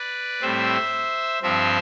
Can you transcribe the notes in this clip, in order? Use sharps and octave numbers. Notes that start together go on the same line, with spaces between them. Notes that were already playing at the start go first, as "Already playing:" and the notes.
Already playing: B4 D5
A2 G3 C4 C5 E5
G2 F3 C4 C5 E5